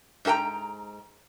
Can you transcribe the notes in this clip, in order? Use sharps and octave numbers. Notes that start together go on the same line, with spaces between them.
G#2 D#4 A4 G5 A#5